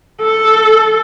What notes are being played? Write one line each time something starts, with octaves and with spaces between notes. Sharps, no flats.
A4